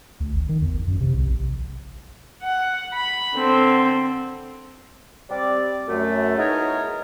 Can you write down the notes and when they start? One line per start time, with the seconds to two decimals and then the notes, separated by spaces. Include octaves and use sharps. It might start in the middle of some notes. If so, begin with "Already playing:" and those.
0.20 D2
0.34 G#1
0.49 D#3
0.62 E2
0.73 G#1
0.88 F#2
1.01 C3
1.14 C2
1.26 A#1
2.42 F#5
2.93 B5
3.36 D3 C4
5.29 G3 C4 D5
5.88 F#2 A3
6.37 B3 D#4 E4 G#4 A#4 C#5